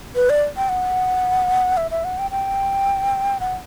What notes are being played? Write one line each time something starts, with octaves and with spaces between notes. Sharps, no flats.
B4
D5
G5
F#5
E5
E5
F#5
G5
G5
F#5